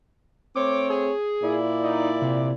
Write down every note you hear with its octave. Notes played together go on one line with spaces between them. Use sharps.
A3 C4 C#5 D6
G#4
A#2 E4 D5
D#4
C3